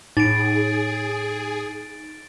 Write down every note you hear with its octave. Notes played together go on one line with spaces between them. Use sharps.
A2 D#4 G#4 A6 D7